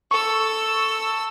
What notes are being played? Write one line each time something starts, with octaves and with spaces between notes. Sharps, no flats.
A4 C#6 E6